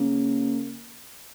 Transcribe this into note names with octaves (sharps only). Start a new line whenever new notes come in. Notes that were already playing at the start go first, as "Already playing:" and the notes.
Already playing: C#3 A#3